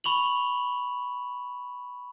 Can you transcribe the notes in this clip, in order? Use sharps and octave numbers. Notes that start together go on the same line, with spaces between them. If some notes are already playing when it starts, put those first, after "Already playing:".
B5 C#6 F7 F#7